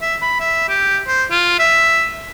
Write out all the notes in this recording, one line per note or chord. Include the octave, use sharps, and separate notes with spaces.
E5
B5
E5
G4
C5
F4
E5